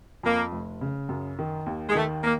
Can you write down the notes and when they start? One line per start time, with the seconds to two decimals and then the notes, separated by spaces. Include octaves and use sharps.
0.23 F2 A#3
0.52 F1
0.81 C#3
1.09 F#2
1.39 D#3
1.66 D#2
1.88 G#3
1.95 D#3 A3
2.24 A#3